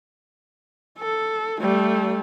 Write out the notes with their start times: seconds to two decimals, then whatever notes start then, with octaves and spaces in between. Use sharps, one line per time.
0.99 A4
1.61 G3 A3